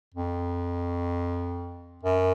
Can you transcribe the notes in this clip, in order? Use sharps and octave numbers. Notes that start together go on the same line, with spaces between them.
F2
F#2